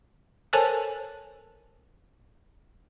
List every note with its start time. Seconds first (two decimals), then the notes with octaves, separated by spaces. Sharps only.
0.53 A4 A#4 C5 C#5 G#5 A5